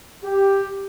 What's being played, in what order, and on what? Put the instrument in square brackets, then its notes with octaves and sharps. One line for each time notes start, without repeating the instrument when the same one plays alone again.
[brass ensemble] G4